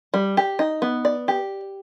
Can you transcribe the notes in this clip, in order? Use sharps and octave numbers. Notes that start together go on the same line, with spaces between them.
G3
G4
D#4
B3
D5
G4